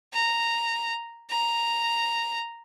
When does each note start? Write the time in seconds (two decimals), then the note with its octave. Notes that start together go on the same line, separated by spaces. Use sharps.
0.13 A#5
1.30 A#5